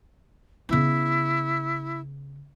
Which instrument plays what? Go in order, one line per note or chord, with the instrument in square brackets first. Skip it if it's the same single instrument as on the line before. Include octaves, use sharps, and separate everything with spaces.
[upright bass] C#3 B3 [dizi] E4